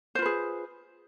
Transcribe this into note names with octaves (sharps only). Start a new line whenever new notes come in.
F4 G#4 B4 C5